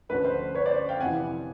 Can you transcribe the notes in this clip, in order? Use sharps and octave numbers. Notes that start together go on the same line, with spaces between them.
D2 D3 F3 A3 C#4 B4
C5
B4 C#5
C5 D5
F5 G5
F2 C3 E3 F#5 G#5